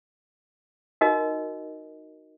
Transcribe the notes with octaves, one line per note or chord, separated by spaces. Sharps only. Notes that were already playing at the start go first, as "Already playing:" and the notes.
D#4 F#4 A#4 D#5